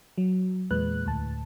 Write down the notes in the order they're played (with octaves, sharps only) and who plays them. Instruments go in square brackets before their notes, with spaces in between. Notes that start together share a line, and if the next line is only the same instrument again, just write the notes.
[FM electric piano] F#3
E2 A#2 G#3 B4 F#6
D2 A2 A5